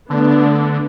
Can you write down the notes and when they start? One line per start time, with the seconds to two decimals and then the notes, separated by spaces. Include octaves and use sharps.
0.10 D3 A3 B3 D4